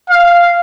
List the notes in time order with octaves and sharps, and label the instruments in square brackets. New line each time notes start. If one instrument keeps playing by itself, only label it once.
[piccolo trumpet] F5